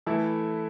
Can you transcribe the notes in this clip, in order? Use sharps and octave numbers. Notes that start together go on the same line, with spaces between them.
E3 A3 E4 A4 E5